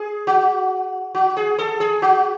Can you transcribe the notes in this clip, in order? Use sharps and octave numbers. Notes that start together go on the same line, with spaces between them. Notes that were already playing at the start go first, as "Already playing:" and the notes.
Already playing: G#4
F#4
F#4
G#4
A4
G#4
F#4